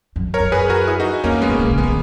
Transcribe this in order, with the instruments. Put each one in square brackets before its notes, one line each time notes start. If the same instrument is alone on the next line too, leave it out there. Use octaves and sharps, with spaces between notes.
[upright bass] F#2
[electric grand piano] A#4 C#5
[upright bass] F#2
[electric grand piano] G#4 B4
F#4 A#4
E4 G#4
D#4 F#4
[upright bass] E2 [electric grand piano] A#3 C#4
[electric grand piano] G#3 B3
[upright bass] G#2
[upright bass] B2 [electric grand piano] A#3
[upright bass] C#3
[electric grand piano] G#3 B3
[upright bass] D#3